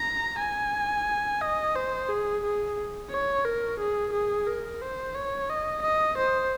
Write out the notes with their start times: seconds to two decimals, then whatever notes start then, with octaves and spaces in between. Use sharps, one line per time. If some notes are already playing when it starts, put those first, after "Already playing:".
Already playing: A#5
0.39 G#5
1.41 D#5
1.75 C5
2.09 G#4
2.44 G#4
3.11 C#5
3.45 A#4
3.79 G#4
4.13 G#4
4.47 A#4
4.81 C5
5.14 C#5
5.50 D#5
5.82 D#5
6.18 C5